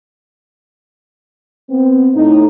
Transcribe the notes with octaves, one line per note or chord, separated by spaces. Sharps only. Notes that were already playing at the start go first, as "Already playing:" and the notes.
B3 C4
A2 D#4